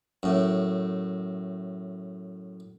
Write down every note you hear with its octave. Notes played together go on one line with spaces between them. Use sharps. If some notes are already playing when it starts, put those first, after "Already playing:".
F#2 A2